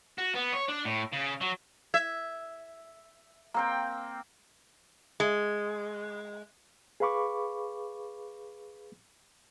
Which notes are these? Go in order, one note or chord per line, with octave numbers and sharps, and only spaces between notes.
F#4
B3
C#5
D4
A2
C#3
F#3
E5 G#6
A#3 C4 G5 A#5
G#3
G#4 B4 F5 B5 C#6 D6